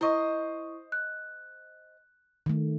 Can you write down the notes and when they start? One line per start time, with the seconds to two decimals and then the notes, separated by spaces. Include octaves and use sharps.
0.01 E4 C5 D#5 C#6 D#6
0.92 F#6
2.46 D#3 A3